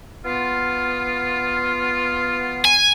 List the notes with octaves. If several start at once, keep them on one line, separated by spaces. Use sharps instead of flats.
B3 F4
G#5